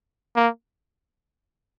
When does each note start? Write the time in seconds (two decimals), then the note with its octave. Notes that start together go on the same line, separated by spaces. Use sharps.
0.36 A#3